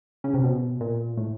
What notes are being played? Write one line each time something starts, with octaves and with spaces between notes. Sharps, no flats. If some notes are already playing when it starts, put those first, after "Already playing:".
C#3
C3
B2
A#2
A2